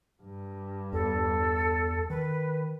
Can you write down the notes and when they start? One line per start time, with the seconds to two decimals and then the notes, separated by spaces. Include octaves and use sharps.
0.22 G2
0.93 E2 A4
2.10 D#3 B4